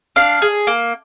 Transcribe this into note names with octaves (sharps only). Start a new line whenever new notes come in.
D4 F5
G#4
A#3